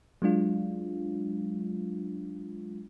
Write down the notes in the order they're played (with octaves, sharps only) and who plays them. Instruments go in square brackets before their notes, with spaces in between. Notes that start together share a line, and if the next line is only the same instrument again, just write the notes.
[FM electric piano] F#3 G#3 D4 F4